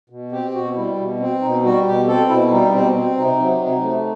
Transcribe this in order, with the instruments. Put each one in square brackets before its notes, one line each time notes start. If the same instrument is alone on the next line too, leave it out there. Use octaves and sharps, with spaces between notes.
[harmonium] B2
C4 G4
B2 F#4
G3 E4
B2
C4
B2 D#4
G3 F#4
B2 G4
C4 A4
B2 E4
G3 D#4
B2 C4
C4
C3 D#4
F#3
C3 D#4
A3